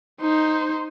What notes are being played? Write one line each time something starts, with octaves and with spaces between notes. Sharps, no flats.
D#4 C5